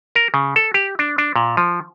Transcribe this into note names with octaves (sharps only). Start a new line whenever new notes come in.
A#4
C#3
A4
G4
D4
D4
A#2
F3